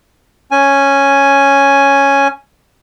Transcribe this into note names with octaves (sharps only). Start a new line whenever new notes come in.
C#4 G#5